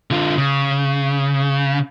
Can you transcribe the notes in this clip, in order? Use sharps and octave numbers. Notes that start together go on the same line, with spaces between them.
D3 F4
C#3